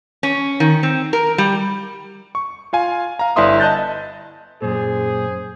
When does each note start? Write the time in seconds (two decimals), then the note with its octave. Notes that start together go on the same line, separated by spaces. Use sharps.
0.23 C#4
0.60 D#3
0.83 C4
1.13 A#4
1.38 G3
2.35 C#6
2.73 F4 F5 G#5
3.19 F5 A#5
3.36 G1 E4 D5 E5 C6 D#6
3.60 D#5 A5 F#6 G6 A6
4.62 F#2 A#2 G#4 C5